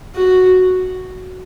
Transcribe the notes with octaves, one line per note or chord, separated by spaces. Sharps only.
F#4